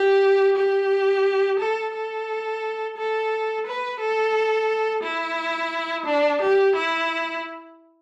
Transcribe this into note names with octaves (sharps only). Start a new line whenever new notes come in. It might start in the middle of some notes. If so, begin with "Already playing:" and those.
Already playing: G4
G4
A4
A4
A4
B4
A4
E4
D4
G4
E4